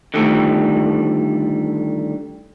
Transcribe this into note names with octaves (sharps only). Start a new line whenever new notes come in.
D3 D#3 F3 G3 A3